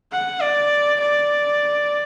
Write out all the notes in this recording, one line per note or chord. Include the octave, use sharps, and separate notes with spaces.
F#5
D5
D5